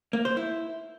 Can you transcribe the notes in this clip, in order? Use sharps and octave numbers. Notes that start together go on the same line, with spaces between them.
A#3
C5
E4